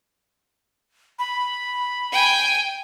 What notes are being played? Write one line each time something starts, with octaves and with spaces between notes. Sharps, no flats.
B5
G5 G#5